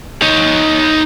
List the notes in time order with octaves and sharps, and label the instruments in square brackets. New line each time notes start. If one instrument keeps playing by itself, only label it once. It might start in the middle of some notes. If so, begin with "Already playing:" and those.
[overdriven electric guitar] D#4 C#5